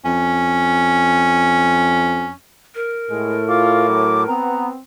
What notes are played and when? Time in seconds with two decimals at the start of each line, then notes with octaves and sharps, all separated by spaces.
0.05 F2 C#4
2.75 A#4
3.10 A2 G#3
3.49 F4 D6
3.88 F#3
4.28 B3 C4 A#5